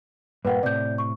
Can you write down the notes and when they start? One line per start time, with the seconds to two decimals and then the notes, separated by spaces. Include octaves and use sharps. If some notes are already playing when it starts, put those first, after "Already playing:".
0.45 G2 A#2 A#3 B4 F#5 G5
0.63 A2 C3 D5 G6
0.98 C#6